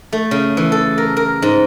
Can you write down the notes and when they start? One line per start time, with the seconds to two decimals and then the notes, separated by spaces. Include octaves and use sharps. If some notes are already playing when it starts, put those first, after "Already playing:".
0.13 A3
0.31 C#3
0.57 E3
0.72 A4
0.98 A#4
1.17 A#4
1.42 G#2